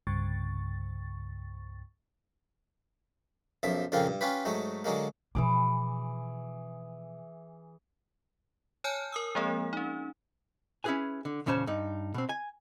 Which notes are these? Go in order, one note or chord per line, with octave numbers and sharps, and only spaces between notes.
C2 G2 C#3 C#6 A6
B1 F#2 F3 E5
F2 A#2 C#3 A#3 C4 F4
G2
C#4 F4 G4 B4
G#2 F#3 A3
D3 F#3 G#3 A#3
B2 E3 F3 G#4 D6
C#5 G#5 A5 F6 G6
A#4 D#6 E6
F3 G#3 A#3 C4 G#4
C#4 D#4
C#4 E4 F4 G#4 B4 G#5
D3
E2 A#2 C#3 C#4 C5 A5
G2 D#4
B2 C4
G#5